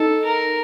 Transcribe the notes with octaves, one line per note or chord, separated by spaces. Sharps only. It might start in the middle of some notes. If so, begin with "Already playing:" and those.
Already playing: D#4 A4
A#4